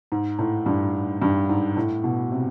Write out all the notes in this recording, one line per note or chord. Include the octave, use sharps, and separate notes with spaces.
G#2
A2
G2
G2
G#2
A2
B2
C3